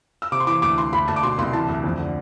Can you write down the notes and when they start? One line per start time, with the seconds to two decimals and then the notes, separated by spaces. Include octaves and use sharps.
0.22 E6
0.32 C3 D6
0.40 C6
0.47 E3 D6
0.62 D2 D6
0.78 E3 C6
0.93 D2 B5
1.08 D2 A5
1.16 D6
1.23 B2 C6
1.38 C2 C6
1.53 E3 A5
1.69 D2
1.84 F2
1.99 D3